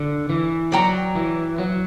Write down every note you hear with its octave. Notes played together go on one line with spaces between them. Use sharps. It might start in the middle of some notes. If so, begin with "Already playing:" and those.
Already playing: D3
E3
F#3 D5 G5 A#5 C#6
E3
F#3